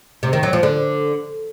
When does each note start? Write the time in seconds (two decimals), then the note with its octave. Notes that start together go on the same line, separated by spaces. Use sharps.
0.23 C3
0.33 D#3
0.43 F#3
0.53 F3
0.63 D3